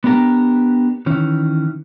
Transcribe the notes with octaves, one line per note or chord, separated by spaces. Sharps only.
B3 D4 G4 A#4
D#3 E3 C#4